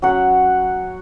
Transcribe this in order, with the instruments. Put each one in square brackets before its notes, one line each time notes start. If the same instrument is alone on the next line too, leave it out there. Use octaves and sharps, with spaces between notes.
[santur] F#3 C#4 F#5